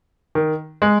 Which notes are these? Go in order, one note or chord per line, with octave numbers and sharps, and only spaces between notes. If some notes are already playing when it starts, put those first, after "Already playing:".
D#3
G#3